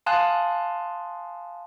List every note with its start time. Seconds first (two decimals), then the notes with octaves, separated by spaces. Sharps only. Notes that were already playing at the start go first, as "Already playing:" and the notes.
0.06 F5 G#5 A5 C6 D#6 F#6